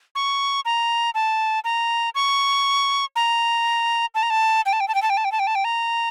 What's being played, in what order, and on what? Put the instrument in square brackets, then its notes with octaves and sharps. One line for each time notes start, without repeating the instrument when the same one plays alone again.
[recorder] C#6
A#5
A5
A#5
C#6
A#5
A5
A#5
A5
G5
A5
G5
A5
G5
A5
G5
A5
G5
A5
G5
A5
G5
A#5